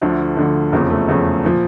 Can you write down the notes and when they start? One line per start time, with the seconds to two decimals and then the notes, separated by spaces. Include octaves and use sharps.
0.02 D2 D3 F3 A3
0.37 D2 D3 F3
0.72 F1 E2 C#3 F3 A#3
0.90 A3
1.07 F1 E2 C#3 F3
1.45 A#2 F3